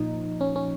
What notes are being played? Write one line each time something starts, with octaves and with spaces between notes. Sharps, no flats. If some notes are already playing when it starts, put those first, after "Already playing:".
Already playing: A#2 F3 D#4
C#4
C#4